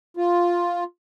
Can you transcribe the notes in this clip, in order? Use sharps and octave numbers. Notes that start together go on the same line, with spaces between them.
F4